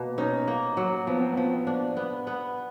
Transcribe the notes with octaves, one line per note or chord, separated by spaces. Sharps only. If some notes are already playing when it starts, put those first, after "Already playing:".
Already playing: B2 A#3
C#4 D#4
A#3
F#3
F3 B3
C4
F3 B3
D4
B3
B3